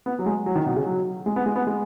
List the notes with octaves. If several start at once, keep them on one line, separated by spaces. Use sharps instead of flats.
B3
F#3
G#3
F#3
D#3
B2
C#3
F#3
G#3
B3
G#3
B3
G#3